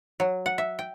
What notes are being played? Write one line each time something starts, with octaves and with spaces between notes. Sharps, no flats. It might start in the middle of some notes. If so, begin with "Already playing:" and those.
F#3
F#5
E5
G5